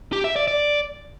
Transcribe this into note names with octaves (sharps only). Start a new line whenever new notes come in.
G4
E5
D5
D5